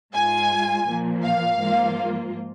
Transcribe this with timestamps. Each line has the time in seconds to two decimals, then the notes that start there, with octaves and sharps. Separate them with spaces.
0.14 G#2 G#3 F4 G#5
0.86 A#2 F3 A#3
1.23 F5
1.59 G#2 F3 A#3 F4